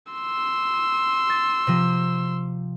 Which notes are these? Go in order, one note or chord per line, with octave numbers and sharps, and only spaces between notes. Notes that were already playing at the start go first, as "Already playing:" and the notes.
C6 E6
A6
C3 F3